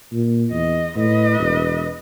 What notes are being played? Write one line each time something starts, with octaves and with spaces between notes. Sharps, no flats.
A#2
E2 D#5
A2 B4 D#5
E1